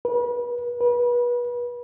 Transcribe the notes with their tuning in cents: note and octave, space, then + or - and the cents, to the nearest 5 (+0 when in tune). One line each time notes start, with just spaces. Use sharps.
B4 -35
B4 -30